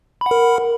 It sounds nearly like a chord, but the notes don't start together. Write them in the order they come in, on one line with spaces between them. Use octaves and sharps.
B5 F#5 A#4